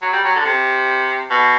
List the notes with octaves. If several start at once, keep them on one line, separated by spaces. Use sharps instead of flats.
F#3
G3
F#3
D3
C3
B2